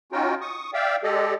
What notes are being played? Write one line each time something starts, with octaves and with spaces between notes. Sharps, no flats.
C#4 D#4 F4 F#4 G5
C#6 D#6
D5 E5 F5 G5
G#3 G4 A4 D5 D#5